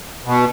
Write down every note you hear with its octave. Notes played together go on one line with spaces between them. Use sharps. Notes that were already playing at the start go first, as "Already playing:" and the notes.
B2